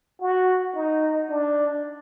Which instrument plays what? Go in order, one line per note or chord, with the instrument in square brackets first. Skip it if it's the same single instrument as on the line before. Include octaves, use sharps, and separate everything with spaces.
[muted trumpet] F#4
D#4
D4